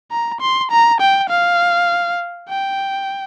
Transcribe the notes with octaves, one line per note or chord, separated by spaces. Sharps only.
A#5
C6
A#5
G5
F5
G5